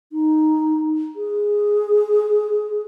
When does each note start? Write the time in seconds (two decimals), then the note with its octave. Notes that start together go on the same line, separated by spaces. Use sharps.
0.13 D#4
1.16 G#4